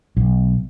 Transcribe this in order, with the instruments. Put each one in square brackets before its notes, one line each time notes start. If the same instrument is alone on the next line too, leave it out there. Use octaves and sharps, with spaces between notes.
[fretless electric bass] B1